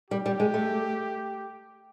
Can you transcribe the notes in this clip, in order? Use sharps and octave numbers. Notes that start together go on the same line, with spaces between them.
G3 G4
G3
G#3
A3